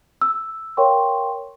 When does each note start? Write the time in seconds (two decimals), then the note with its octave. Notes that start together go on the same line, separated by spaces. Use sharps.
0.22 E6
0.77 A#4 C#5 F5 G5 C6 C#6